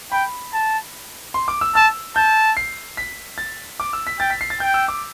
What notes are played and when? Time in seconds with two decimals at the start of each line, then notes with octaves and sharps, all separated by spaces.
0.12 G5 B5
0.53 A5
1.34 C6
1.48 D6
1.61 E6
1.75 A5 E6
2.16 A5 G6
2.57 C7
2.97 B6
3.38 A6
3.80 D6
3.93 E6
4.07 B6
4.19 G5 A6
4.30 B6
4.41 C7
4.50 A6
4.60 G5 G6
4.74 E6
4.88 D6